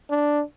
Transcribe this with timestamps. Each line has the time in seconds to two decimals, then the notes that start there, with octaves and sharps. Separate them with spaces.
0.10 D4